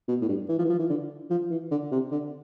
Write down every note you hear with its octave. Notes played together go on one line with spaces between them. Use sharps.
B2
A2
G2
E3
F3
E3
F3
E3
D3
F3
E3
D3
C3
D3